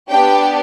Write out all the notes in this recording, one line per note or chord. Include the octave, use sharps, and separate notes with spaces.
B3 D4 G4 G5